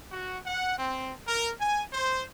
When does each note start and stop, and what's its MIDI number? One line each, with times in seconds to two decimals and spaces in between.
0.12 0.38 66
0.47 0.78 78
0.78 1.11 60
1.28 1.51 70
1.61 1.83 80
1.93 2.24 72